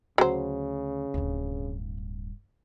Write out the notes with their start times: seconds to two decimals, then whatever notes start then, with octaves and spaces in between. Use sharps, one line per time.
0.18 D2 C#3 F#3 C5
1.14 D1 G2